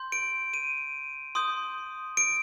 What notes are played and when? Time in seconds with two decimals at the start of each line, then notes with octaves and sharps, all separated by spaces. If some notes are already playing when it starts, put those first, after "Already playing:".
Already playing: C6 G6
0.12 D7
0.54 D#7
1.35 C6 D#6 G6
2.17 D7